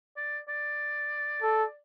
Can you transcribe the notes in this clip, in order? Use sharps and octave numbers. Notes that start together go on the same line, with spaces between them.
D5
D5
A4